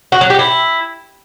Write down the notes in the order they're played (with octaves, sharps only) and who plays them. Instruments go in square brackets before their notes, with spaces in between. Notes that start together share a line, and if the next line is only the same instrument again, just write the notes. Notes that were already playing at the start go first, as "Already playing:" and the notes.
[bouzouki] F#4
F#3
G4
E4